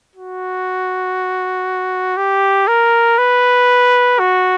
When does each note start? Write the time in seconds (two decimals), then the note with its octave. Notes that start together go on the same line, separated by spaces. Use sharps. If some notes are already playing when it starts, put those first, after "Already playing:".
0.15 F#4
2.17 G4
2.67 A#4
3.18 B4
4.19 F#4